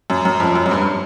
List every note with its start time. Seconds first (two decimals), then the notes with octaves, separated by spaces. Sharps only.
0.10 F#2
0.25 F#2
0.40 F2
0.55 F#2
0.66 F#2
0.71 G2